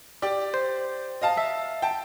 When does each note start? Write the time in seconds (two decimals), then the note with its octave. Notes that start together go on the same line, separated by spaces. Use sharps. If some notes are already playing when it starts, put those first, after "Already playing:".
0.22 G4 D5
0.54 C5
1.22 D#5 F5 A5
1.37 E5
1.82 G5 A5